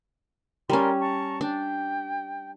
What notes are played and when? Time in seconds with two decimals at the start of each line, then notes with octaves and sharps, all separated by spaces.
0.70 G3 C#4 A#4 D5 C6
0.99 A5 A#5 C#6
1.41 D4 G5